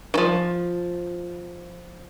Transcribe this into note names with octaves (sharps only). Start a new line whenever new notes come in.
D#3 F3